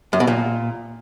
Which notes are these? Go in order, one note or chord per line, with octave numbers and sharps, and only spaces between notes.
F#2
B2
A#2